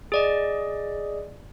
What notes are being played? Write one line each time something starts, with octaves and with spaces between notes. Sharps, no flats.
G#4 D5 D#5